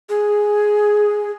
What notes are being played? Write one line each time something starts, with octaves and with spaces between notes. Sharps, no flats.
G#4